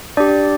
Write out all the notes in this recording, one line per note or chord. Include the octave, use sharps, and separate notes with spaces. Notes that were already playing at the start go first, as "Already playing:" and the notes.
D4 G4 D5